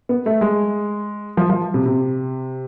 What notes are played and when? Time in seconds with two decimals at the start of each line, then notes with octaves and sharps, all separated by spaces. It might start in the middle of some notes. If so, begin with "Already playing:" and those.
0.09 B3
0.26 A3
0.41 G#3
1.37 F3
1.50 F3
1.74 C3
1.86 C3